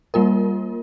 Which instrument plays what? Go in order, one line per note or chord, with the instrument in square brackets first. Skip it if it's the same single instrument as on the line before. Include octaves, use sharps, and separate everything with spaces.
[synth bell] G3 A#3 F4 A#4